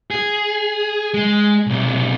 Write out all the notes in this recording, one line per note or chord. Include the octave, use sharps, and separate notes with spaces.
G#4
G#3
B1 C3